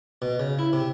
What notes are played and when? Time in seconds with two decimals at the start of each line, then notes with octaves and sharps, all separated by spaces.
0.22 B2
0.39 C#3
0.59 E4
0.73 C3